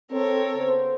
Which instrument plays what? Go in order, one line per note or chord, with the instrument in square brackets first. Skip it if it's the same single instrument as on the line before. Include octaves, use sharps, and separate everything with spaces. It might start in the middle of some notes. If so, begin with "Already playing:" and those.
[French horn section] C4 [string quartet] A4 A#4 C#5
[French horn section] C#3 B3 C5